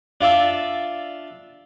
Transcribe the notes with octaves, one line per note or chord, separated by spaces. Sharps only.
D4 F4 D5 E5 A5